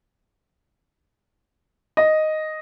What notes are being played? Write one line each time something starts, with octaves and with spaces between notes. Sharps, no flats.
D#5